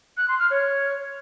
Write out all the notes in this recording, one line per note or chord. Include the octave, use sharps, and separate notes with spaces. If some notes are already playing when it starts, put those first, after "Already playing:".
F#6
C6
F6
C#5